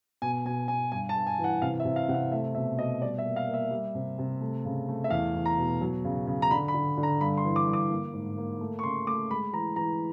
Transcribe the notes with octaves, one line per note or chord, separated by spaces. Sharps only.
B2 G#5
B2 G#5
B2 G#5
G2 G#5
A5
G2
G#5
E3
F#5
C3 F5
E5
C3
F5
C3 F#5
F5
A3 E5
B2 E5
B2 D#5
G3 D5
E5
A#3
F5
A#3
E5
G3
C3
C3
A3
C#3
A3
E5
E2 F5
E2
A#5
B2
F#3
C#3
C#3
A#5
D3 B5
B5
D3
D3
A#5
G2 B5
C6
E3
D6
G2
D6
A#3
G#2
A#3
A3
C#6
C#3 C6
A3 D6
G#3 B5
E3 A#5
E3 A#5